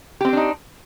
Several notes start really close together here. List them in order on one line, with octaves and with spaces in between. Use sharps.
G4 C4 C5 D4 D#4